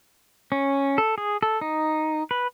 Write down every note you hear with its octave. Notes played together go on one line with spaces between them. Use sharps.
C#4
A4
G#4
A4
D#4
B4